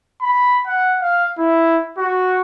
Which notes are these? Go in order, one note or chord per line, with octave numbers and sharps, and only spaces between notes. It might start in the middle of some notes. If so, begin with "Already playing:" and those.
B5
F#5
F5
E4
F#4